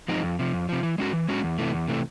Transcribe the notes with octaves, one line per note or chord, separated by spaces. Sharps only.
F3 G#3 C4 D#4
F2
C3 F3
F2
C3 F3
E3
G#3 C#4 F#4
E3
G#3 C#4 F#4
E2
C3 E3 A3
E2
C3 E3 A3